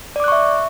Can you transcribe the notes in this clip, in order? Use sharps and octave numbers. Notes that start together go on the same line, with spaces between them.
D5 E5 C#6 D6 F#6